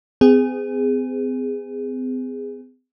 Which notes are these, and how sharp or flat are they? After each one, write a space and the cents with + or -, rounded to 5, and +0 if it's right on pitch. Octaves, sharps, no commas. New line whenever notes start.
C4 -45 G#4 -10